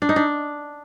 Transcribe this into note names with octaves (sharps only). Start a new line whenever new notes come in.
D4
D#4
D4